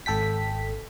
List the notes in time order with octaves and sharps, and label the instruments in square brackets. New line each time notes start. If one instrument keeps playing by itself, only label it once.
[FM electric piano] G#1 A4 G5 B6